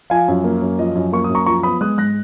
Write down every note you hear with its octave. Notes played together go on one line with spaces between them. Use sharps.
F3 F5 G#5
F#2
A#3
F#2
F3 D#5
F#2
A#3 C#6
D#6
F#2
A#5 C#6
F3 A#5 C#6
B3 B5 D#6
G#3 D#6 F#6
G#2 F#6 A#6